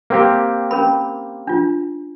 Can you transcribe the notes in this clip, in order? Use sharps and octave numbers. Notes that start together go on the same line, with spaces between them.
A#3 C4 G4
C#4 A#4 B5
D4 F4